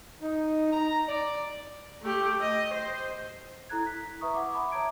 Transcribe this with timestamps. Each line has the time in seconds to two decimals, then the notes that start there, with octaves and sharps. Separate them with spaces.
0.21 D#4
0.72 A#5
1.08 D5
2.02 A3 G4
2.40 D#5
2.73 C5
3.69 E4 A4 A#5 F#6 G#6
3.87 B6
4.21 B4 E5 A#5 C#6 D#6
4.34 F#5 D6
4.53 E5 A5 B5 D6
4.72 C#5 E5 A#5 D6 G#6 D7